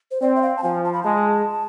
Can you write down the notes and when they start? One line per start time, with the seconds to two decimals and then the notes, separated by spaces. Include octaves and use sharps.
0.11 C5
0.21 C4 D5
0.36 E5
0.42 F5
0.57 A5
0.63 F3 G#5
0.84 A5
0.93 B5
1.03 G#3 A5